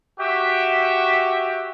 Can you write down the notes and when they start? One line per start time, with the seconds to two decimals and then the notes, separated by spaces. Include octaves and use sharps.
0.20 F#4 G4 E5